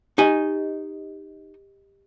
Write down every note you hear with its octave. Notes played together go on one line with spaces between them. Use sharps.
D#4 G4 D#5 G#5